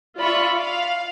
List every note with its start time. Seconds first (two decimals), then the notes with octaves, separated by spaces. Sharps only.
0.19 F4 D5 E5 B5 C#6
0.58 F5